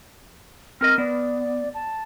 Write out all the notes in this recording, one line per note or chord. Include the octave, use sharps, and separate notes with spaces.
C4 A#4 D#5 F6
B3 D5
A5